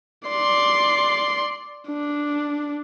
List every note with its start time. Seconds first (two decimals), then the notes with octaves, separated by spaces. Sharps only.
0.29 D5 C6
1.88 D4